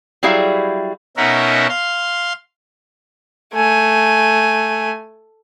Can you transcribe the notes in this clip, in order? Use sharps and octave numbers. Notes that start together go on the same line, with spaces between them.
F#3 G3 E4 G#4 E5 F5
B2 C#4 D#4 A#4 E5 F#5
F5 C6
A3 G#5